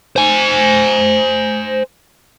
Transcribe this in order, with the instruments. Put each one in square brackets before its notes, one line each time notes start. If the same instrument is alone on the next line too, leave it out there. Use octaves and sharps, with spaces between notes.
[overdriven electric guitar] C5 G#5